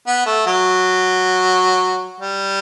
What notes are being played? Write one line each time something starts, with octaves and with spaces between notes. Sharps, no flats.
B3
A3
F#3
G3